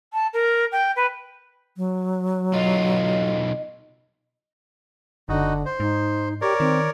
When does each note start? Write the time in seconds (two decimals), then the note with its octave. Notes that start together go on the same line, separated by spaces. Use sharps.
0.13 A5
0.33 A#4
0.72 G5
0.96 B4
1.77 F#3
2.54 B1 F4 D#5
5.29 F#1 D3 D#4 F#4
5.66 C5
5.80 G#2 D#4
6.41 G4 A#4 C#5 D5
6.60 D#3 C4